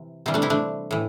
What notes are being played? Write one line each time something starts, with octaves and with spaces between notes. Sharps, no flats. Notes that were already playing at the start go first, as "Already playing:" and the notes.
Already playing: C3 E3
C3 E3 G3 C4
A3 D4
C4 E4
A3 D4
A2 E3